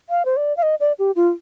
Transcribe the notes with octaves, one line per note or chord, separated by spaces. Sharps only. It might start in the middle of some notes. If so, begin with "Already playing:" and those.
F5
C5
D5
F5
D#5
D5
G4
F4